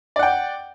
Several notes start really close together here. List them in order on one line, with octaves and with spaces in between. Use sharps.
D5 F#5 G5